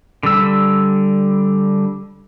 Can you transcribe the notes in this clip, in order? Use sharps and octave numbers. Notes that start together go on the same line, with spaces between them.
D3 G3 E6